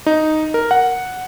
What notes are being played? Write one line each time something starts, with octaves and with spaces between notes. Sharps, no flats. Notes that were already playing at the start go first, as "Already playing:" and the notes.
D#4
A#4
F#5